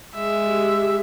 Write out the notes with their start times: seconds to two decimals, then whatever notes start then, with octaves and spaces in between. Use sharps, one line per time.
0.15 G#3 E5
0.46 G4